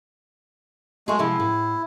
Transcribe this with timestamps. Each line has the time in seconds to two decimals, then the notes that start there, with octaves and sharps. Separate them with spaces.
1.08 F#3 G#3 A3 G#4
1.19 C3 F3 G#3 E4
1.40 A2